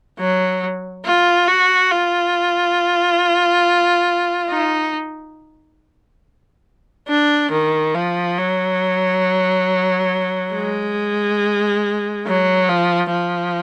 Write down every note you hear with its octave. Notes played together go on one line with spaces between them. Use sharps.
F#3
F4
F#4
F4
D#4
D4
D#3
F3
F#3
G#3
F#3
F3
F3